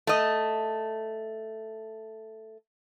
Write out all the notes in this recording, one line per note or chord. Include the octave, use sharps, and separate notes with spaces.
A3 D#5